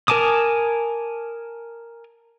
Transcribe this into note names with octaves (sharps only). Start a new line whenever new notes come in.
A#4 G#5 A5 D6 D#6